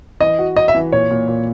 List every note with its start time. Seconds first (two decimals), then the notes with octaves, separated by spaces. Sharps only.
0.21 E3 D#5
0.39 F#4
0.56 F#4 D#5
0.68 E5
0.75 E3
0.92 A#2 C#5
1.11 A#2
1.28 A#2